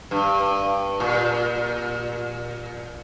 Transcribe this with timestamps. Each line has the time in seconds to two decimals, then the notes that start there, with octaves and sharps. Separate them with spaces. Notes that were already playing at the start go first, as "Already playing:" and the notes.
0.11 G2
1.00 A#2